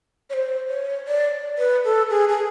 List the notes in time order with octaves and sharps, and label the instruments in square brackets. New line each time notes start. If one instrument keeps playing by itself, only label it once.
[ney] C#5
C5
C#5
D5
B4
A4
G#4
G#4